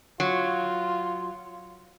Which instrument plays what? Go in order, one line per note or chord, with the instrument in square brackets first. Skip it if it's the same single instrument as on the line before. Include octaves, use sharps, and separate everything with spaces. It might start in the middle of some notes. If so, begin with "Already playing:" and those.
[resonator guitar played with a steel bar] F#3 [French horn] F4